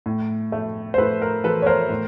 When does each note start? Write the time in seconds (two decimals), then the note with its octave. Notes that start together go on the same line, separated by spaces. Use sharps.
0.06 A2
0.52 A3
0.94 C5
0.98 A2 A4 B4
1.22 A#4
1.44 E3 A4 B4
1.62 C#5
1.66 A#4 C5
1.89 A2